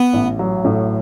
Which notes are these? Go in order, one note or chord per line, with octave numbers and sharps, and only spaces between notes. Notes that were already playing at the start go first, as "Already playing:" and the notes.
Already playing: B3
A1
F#3
A2